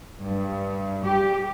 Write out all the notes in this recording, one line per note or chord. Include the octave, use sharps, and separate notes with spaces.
G2
G4